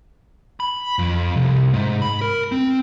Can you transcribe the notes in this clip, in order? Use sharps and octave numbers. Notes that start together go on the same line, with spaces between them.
B5
F2
C2
G#2
B5
A#4
C4